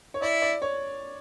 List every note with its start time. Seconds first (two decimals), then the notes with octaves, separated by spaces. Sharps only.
0.14 C#5
0.21 E4 D5
0.42 D5
0.62 C#5